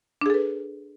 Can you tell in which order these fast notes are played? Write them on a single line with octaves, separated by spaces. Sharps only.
D4 G#4 A4 B4